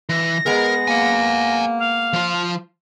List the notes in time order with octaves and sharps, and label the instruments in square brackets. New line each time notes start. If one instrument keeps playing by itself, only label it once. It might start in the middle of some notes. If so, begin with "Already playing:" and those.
[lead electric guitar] E3 [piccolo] A#6
[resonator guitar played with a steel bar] G#3 B3 G#4 [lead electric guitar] A#4
[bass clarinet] A#3 [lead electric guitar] F#5 G#5
[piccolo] F5
[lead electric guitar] F3 F4